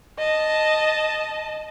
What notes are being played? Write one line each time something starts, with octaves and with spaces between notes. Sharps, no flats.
D#5 A5